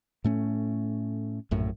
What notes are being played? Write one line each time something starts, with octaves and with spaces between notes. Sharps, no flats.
A2 A3 C#4
A#1 F#2 A2